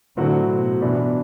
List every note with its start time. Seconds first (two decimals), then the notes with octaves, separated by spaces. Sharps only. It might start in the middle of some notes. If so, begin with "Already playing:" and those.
0.17 A2 D3 F#3 C4 F#4
0.49 B2
0.81 G2 B2 E3 B3 D4 F#4